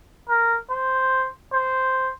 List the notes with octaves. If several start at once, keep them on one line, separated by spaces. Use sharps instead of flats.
A#4
C5
C5